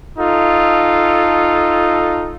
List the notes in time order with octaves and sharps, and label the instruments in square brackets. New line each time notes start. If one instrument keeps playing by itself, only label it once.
[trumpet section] D#4 F4 A4